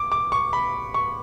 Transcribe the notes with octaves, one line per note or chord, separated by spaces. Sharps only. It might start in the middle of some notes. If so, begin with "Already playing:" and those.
Already playing: D6
D6
C#6
B5
C#6